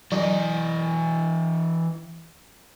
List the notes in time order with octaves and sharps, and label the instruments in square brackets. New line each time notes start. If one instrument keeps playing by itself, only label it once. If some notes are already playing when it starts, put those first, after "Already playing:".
[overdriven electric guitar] E3 D#5 [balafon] F#3